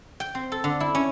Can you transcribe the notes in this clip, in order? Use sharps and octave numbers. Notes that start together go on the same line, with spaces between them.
G5
C4
A4
D3
E4
C#4